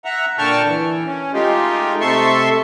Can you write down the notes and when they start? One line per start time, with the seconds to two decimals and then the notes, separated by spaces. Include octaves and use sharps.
0.05 E5 F#5 A#5
0.38 A#2 D3 G5 A5 C#6 F6
0.67 E3
1.06 C#4
1.33 G#3 A3 D#4 F4 G4
2.01 C3 A3 A4 E5 C6 C#6